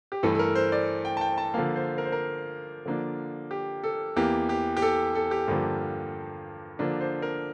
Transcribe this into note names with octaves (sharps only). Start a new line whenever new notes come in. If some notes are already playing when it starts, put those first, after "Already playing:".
G4
G2 E3 A3 A4
A4
A#4
C5
D5
G5
A5
G5
A5
D3 F3 A#3 F5
C5
A#4
C5
A#4
D3 F3 A#3 D4
G4
A4
E2 E3 A#3 G4
G4
G4
A4
A4
G4
G2 D3 F3 A#3
D3 F3 A#3 D4
C5
A#4